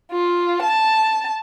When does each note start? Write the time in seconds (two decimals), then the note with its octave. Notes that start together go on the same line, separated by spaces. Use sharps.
0.12 F4
0.62 A5